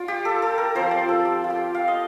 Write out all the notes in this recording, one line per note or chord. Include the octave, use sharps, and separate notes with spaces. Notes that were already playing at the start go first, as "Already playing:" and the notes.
Already playing: F4 D5
G4
A4
A4
A#4
F3 C4 F4 C5
D5
A4
G4
F4
G4
F5
D#5